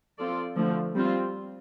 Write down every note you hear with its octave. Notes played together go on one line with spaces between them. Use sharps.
F3 C4 F4 A4 D5
D3 F3 A3
G3 C4 F4